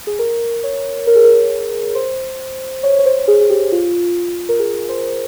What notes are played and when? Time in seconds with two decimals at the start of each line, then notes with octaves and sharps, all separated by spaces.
0.07 G#4
0.19 A#4
0.64 C#5
1.07 A#4
1.16 G#4
1.24 A#4
1.95 C5
2.83 C#5
2.99 C#5
3.06 C5
3.28 G#4
3.41 G#4
3.50 G4
3.72 F4
4.49 A#4
4.59 G#4
4.89 C5